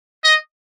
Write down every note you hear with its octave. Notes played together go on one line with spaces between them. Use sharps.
D#5